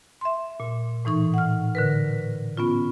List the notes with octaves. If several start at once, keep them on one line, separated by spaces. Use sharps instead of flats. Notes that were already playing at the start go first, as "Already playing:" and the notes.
E5 C6
A#2
A2 E3 D#4 C#6
F#5 F6
D3 A#4 B4
B3 C#4 F4